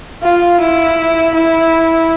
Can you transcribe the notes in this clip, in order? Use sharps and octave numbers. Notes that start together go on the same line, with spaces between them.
F4
E4
E4